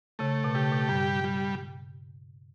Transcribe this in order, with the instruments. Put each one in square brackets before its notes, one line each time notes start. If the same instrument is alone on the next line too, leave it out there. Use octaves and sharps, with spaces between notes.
[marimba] C#3 [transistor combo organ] A3
[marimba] B2
[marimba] C#3 [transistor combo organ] G4
[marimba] B2
[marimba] G2 [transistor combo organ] G3
[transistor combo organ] G3